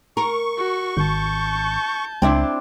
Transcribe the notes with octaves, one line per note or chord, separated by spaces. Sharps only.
A#4 C#6
F#4
G#1 A5 G6
C#2 C4 D4 E4